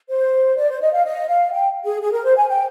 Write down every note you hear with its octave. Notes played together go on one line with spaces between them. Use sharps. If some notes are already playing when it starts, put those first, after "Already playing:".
C5
D5
C5
D#5
F5
D#5
F5
G5
G#4
G#4
A#4
C5
G#5
G5